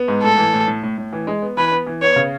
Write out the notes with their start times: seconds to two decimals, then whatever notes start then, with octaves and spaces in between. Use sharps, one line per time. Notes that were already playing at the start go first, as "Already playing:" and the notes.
Already playing: B3
0.08 G#2
0.23 A2 A4
0.38 E3
0.53 A2
0.67 A2
0.83 A2
0.98 A2
1.13 E3
1.27 G#3
1.42 B3
1.57 E3 B4
1.72 B3
1.86 E3
2.02 B3 C#5
2.16 C#3